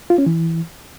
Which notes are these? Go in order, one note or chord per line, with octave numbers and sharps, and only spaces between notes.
F4
C#4
E3